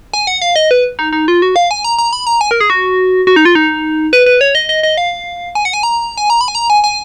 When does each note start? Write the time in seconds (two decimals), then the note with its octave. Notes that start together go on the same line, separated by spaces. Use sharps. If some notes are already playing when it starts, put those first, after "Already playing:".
0.14 G#5
0.27 F#5
0.42 F5
0.56 D#5
0.71 B4
0.99 D#4
1.13 D#4
1.28 F4
1.42 F#4
1.56 F5
1.71 G#5
1.84 A#5
1.98 A#5
2.13 B5
2.27 A#5
2.41 G#5
2.51 A#4
2.60 G#4
2.70 F#4
3.27 F#4
3.36 D#4
3.45 F4
3.55 D#4
4.13 B4
4.26 B4
4.41 C#5
4.55 D#5
4.69 D#5
4.83 D#5
4.97 F5
5.55 G#5
5.65 F#5
5.73 G#5
5.83 A#5
6.18 G#5
6.30 A#5
6.41 B5
6.48 G#5
6.55 A#5
6.70 G#5
6.84 G#5